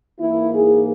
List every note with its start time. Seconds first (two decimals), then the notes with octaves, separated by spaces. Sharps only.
0.19 G#2 E3 A#3 E4
0.52 G#4